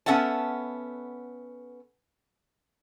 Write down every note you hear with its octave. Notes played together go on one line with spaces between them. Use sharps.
B3 C#4 A4 E5 F#5 A5